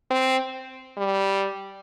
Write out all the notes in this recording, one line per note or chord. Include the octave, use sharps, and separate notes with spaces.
C4
G3